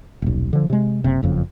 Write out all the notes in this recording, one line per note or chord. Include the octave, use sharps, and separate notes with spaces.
D#1 B1
D3 F3
C3 G#3
F#1 C3
F#1 F2 C#3